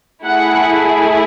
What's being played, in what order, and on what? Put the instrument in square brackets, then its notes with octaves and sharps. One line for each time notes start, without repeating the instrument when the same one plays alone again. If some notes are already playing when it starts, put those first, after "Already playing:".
[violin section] A3 E4 G#4 F#5